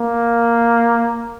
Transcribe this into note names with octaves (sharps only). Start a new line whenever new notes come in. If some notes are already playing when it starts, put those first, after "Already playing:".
Already playing: A#3